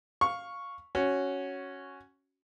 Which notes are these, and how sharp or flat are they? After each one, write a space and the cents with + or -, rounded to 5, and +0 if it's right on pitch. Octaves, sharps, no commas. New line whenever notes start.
F5 +10 C#6 +0
C#4 +0 F#4 +5